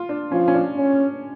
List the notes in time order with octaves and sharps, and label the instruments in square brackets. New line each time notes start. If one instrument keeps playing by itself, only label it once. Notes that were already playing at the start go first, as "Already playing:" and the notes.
Already playing: [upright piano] F4
D4
[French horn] F3 [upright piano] C#4
[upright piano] C#4
D4
[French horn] C#4